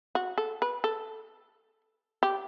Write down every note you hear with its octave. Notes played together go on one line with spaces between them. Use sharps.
F#4
A4
B4
A4
G4